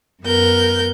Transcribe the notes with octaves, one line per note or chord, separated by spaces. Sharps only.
F#2 B3 A#4 G6